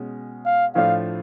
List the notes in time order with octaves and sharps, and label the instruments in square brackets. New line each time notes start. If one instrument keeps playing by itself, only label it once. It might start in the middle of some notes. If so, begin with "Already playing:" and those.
Already playing: [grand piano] B2 G#3 C#4
[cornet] F5
[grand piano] A2 F3 A3 D4 F4 [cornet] F5